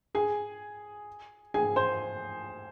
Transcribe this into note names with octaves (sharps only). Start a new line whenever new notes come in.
G#4 G#5
G#4 G#5
C5 C6